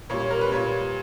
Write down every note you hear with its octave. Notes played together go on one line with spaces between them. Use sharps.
A#2 G3 C#5
C#5
A#4
B4
A#2 G3 C#5